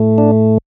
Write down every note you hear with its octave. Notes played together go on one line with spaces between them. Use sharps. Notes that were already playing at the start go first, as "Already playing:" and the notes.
Already playing: A2 A3
D4